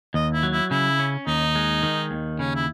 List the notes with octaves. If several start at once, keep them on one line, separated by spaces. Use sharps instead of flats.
D#2 D#5
E4
F#3
E4
C#3 E4
C#4
D#2 D#4
G#3
D#3
D#2
C#3 C#4
E4